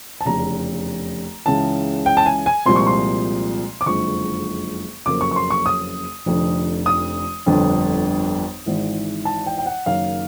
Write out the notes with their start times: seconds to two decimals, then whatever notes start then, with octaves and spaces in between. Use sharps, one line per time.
0.21 A5
0.25 F1 E2 C#3 A#5
1.46 C#2 C#3 E3 A5
2.06 G5
2.17 A5
2.26 G#5
2.46 G#5
2.66 C2 A#2 F3 G#3 C4 C6
2.76 C#6
2.87 C6
3.81 D6
3.86 F#1 F2 D3 F3 G#3 C#6
5.06 F#1 F2 C#3 F#3 A#3 D6
5.21 C#6
5.31 C#6
5.36 C6
5.50 C#6
5.66 D#6
6.26 F1 F2 D3
6.86 D#6
7.46 G1 F2 D3
8.66 G#1 G#2 E3
9.25 A5
9.47 G5
9.58 G5
9.66 F#5
9.86 F#1 F#2 D#3 F5